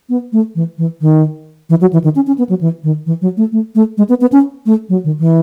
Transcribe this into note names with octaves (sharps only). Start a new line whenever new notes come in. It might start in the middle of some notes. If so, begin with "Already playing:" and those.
B3
A3
E3
E3
D#3
E3
F#3
E3
D#3
C#4
C#4
B3
F#3
E3
D#3
E3
F#3
A3
A3
A3
G#3
B3
B3
C#4
A3
F#3
D#3
E3